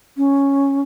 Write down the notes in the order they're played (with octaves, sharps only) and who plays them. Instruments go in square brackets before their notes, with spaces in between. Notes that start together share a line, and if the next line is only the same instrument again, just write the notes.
[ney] C#4